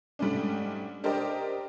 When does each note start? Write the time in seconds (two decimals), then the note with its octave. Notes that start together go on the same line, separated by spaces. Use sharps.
0.19 G#2 G3 A3 C#4 D4
1.04 D4 G4 A#4 C5 D5 D#5